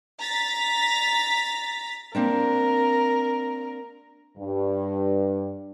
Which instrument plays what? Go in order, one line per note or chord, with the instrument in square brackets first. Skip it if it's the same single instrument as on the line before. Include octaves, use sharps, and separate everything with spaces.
[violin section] A#5 A6 B6
[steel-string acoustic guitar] A#3 C4 D4 [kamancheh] A#4
[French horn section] G2